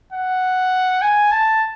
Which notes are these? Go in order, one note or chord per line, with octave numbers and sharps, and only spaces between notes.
F#5
G#5
A5